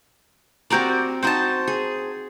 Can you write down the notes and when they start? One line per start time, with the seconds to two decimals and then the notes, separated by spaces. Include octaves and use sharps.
0.70 C4 F#4 G4 A#4 D5 D6
1.23 D#4 F#4 C5 G5 A5
1.68 G#4